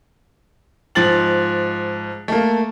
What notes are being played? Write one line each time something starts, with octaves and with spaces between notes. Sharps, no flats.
G#2 F3 A6 F#7
A3 A#3